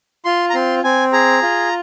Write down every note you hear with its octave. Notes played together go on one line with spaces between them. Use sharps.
F4 C6
A#5
C4 C6
C4 G#5
G#4 A#5
F4